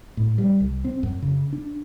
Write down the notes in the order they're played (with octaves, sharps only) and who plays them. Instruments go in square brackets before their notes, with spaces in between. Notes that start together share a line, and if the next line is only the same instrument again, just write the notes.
[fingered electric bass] A2
G3
C2
C4
F#2
C#3
D4